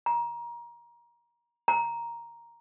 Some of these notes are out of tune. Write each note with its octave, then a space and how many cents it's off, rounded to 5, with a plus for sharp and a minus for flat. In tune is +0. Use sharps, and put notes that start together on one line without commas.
A#5 +25
A#5 +5